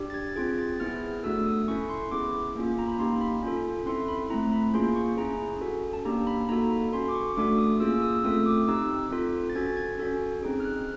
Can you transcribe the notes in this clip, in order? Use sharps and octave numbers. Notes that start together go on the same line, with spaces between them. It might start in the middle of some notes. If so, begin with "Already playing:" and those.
Already playing: D4 G4
A6
G#6
C4 F4 G#4 G#6
A6
B3 E4 G#4 F6
A3 D4 F#4 A4 E6
D#6
C#4 E4 A4 C#6
C6
B3 E4 G#4 D6
A#3 C#4 F4
A#5
B5
A#3 D#4 G4 C6
B5
C#4 F4 A4
C4 E4 A4 C6
B5
A3 C4 E4 A#5
B5
A#3 C#4 F4 G#4 C6
C#6
C#4 E4 G#4 A#5
C#4 F#4 A4
A5
A#3 D4 G4 A#5
B5
A#3 D#4 F#4 A4 A#5
B5
C#4 F#4 A4 C6
D6
C#6
A3 D4 F#4 A4 D6
D#6
A#3 C#4 F4 G#4 E6
E6
D#6
E6
A3 C4 F4 A4 D#6
D6
C4 D#4 G4 E6
C4 F4 A4
A6
C#4 F#4 A4 G#6
G#6
C#4 F#4 A4
C4 D#4 G#4
F6
F#6